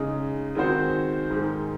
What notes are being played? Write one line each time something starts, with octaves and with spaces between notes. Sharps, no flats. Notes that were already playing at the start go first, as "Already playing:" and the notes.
Already playing: C#3 G#3 D#4
D#3 G#3 C4 F#4 C5
G#2 D#3 G#3